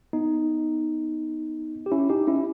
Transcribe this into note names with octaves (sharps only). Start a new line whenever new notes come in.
B3 D#4
G4
C#4 E4
D#4 G4
C#4 E4